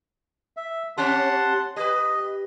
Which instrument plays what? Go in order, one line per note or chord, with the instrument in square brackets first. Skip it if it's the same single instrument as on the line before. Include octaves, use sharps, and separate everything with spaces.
[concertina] E5
[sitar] C4 C#4 G4 [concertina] F#5 A5 C6
[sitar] G4 B4 [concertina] D#5